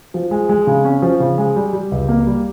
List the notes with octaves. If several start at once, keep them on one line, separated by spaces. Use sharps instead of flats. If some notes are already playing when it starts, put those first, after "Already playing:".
F3
G#3
G#3
C#3
C#4
F3
C#3
G#3
G3
G3
C#2
A#3
G3